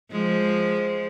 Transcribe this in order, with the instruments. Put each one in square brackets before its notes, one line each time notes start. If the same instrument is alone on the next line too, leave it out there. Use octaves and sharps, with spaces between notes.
[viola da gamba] F3 G#3